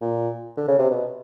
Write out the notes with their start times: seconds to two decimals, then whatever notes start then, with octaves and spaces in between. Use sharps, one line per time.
0.01 A#2
0.57 D3
0.68 C#3
0.79 C3
0.90 B2